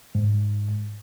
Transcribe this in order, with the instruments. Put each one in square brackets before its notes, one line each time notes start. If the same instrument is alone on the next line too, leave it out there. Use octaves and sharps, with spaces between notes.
[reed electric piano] G#2